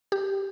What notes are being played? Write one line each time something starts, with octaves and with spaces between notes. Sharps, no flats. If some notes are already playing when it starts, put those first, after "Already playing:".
G4